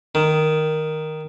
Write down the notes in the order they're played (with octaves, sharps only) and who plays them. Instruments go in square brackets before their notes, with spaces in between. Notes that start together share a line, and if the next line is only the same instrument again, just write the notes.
[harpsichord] D#3